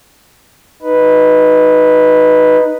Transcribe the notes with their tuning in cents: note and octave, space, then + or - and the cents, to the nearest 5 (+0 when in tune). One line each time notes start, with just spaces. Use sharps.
D#4 +0 B4 +0